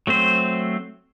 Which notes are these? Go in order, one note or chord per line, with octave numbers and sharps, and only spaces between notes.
F#3 A3 C4 C5